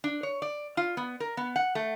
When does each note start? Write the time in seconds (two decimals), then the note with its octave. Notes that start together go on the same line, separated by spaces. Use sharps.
0.04 D4
0.23 C#5
0.42 D5
0.77 F4
0.97 B3
1.20 A#4
1.37 B3
1.56 F#5
1.75 A3